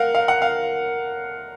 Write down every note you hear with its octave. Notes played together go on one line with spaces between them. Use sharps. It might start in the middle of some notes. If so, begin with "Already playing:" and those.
Already playing: A#4 F5 F#5
F5
F#5
F5